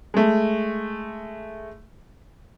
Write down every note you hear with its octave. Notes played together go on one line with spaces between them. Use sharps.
G#3 A3